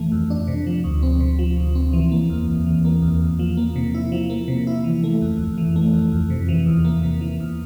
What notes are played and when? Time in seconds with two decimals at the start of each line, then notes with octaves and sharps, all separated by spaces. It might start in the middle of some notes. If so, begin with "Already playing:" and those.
Already playing: F2 E3 A3
0.12 F2
0.30 D4
0.47 C3
0.67 F3
0.84 D2
1.02 C4
1.20 C3
1.39 F3
1.57 D2
1.75 C4
1.93 E3
2.12 A#3
2.30 E2
2.48 E2
2.66 E3
2.85 A#3
3.02 E2
3.21 E2
3.39 F3
3.57 A#3
3.76 C3
3.94 E4
4.12 F3
4.30 A#3
4.48 C3
4.67 E4
4.84 E3
5.04 A3
5.22 F2
5.39 F2
5.58 E3
5.76 A3
5.93 F2
6.12 F2
6.30 C3
6.48 E3
6.66 E2
6.84 A#3
7.03 C3
7.21 E3
7.40 E2